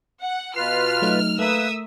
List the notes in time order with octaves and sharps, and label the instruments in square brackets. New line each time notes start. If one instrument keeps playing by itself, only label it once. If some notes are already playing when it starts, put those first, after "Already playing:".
[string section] F#5
[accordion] B2 F4 B4 [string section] F6 [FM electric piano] C7
[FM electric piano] F#3 A3 D#4
[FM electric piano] A3 A#4 [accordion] A#3 B4 [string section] E5 D#6 E6